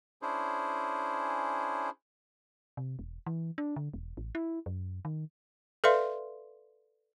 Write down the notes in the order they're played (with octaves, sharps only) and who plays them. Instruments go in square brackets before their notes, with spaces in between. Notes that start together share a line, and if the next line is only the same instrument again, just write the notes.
[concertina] C#4 D4 E4 G#4 C5
[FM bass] C3
E1
E3
D4
D3
E1
A1
E4
F#2
D#3
[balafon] A4 B4 D5 E5 F5 C6